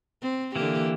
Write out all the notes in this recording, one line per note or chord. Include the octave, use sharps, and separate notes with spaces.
C4
D3 E3 A#3 G4